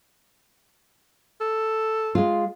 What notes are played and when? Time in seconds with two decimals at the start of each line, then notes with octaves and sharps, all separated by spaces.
1.41 A4
2.15 G#3 F4